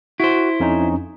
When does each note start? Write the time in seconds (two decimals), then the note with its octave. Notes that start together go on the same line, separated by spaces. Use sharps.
0.20 E4 F#4 C5
0.60 F2 C#4 D#4